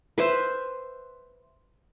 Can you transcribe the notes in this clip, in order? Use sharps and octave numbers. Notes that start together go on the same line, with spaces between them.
B4 C5 E5